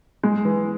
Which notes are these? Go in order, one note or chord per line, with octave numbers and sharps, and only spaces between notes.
G#3
E3